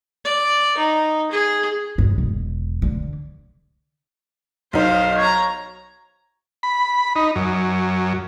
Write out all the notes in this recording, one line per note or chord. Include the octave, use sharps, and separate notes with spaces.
D5
D#4
G#4
G2
E1
D3
B1 D#4 C5 F5
C#5 A#5
B5
D#4
F#2